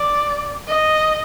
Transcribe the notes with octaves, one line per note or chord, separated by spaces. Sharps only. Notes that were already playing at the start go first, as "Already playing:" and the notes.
Already playing: D5
D#5